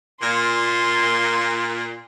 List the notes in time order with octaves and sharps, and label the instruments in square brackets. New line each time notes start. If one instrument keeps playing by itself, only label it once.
[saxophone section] A#2 [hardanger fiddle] C6